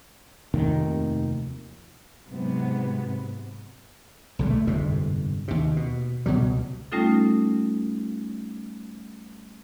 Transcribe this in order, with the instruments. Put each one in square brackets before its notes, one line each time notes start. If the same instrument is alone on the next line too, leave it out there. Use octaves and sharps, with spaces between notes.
[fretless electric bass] F1 D#2 C3 D#3
[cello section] G#2 C3 F#3 B3
[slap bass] B1 D3 G3
A3
G1 F2 G#2 C3
D#2 C3
B2
C#2 B2 F#3 G3
[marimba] G3 A3 C#4 D#4 F4 A4